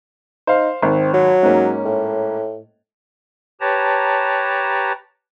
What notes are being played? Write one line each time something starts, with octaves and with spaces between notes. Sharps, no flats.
D#4 C5 F5
G#1 C4
F#3
G#2 A#3 C#4
A2
G4 B4 C#5 A5 A#5